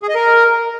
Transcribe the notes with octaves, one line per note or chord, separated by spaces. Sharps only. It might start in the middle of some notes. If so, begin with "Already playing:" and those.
G#4
D#5
A#4